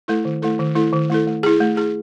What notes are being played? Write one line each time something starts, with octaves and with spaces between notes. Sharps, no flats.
A3 E4 A4
D#3
A3 E4 A4
D#3
A3 E4 A4
D#3
A3 E4 A4
A3
E4 G#4
A3
E4 G#4